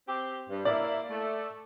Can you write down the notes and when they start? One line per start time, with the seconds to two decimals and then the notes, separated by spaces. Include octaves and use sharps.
0.08 C4 G4
0.50 G2
0.65 A#3 E4 D5
1.10 A3